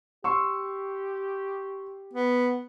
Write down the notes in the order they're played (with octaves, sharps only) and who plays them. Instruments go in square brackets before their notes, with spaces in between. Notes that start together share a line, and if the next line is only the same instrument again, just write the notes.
[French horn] G4 [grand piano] C6 C#6 E6
[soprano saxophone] B3